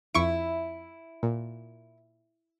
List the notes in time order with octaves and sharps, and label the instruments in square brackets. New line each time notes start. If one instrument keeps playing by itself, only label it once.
[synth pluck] F2 C#6 D7 [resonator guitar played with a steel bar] E4
[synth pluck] A#2